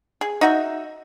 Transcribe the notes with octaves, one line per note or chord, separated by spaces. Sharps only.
G#4
D#4 F#4 E5